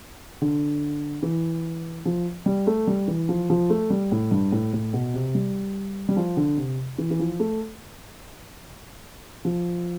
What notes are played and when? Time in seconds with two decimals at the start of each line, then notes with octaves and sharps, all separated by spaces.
0.42 D3
1.23 E3
2.05 F3
2.46 G3
2.67 A3
2.87 G3
3.08 E3
3.29 F3
3.50 F3
3.70 A3
3.90 G3
4.12 A2
4.31 G2
4.52 A2
4.73 A2
4.93 B2
5.14 C3
5.35 G3
6.09 G3
6.17 F3
6.37 D3
6.57 C3
6.98 E3
7.11 E3
7.19 F3
7.40 A3
9.45 F3